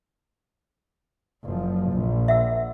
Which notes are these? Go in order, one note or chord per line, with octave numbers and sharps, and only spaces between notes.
F#1 F3
A#1
E5 F#5 E6